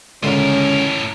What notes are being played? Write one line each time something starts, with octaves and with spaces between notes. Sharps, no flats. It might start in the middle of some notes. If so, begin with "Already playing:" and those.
C#2 A2 D3 C#4 A#4